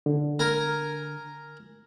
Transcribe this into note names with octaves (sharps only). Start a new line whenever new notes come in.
D3
A#4 G#5 A#5